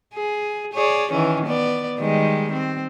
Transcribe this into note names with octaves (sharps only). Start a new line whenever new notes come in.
G#4
G#4 C#5 D5
D#3 E3 C#4
B3 D5
D#3 G3 G#3
C4